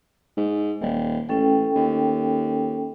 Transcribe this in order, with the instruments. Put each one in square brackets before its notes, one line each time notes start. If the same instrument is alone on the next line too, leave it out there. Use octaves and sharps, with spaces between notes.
[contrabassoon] G#2
D#1
[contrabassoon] A1 [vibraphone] C#4 A4 G5
[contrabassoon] D#2